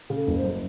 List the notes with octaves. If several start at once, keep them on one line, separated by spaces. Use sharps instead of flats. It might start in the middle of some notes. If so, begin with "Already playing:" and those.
C#3
A4
F#1
C5
F#2